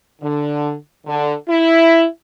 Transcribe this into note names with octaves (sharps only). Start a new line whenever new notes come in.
D3
D3
E4